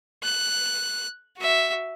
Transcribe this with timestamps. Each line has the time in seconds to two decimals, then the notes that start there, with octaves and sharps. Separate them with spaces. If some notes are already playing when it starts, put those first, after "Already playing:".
0.23 F#6
1.37 F#4 E5